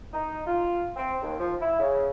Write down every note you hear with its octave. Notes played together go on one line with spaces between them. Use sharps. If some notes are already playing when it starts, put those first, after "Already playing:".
D#4
F4
C4
D#2
F3
E4
C#3